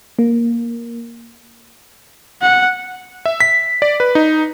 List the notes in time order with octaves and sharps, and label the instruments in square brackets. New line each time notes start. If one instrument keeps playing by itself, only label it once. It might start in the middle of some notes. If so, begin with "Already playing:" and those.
[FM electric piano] A#3
[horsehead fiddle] F#5
[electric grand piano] E5
B6
D5
B4
D#4